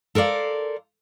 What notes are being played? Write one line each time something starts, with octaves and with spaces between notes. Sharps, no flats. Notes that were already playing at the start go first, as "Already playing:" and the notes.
A4 A#4 C5 D5 F5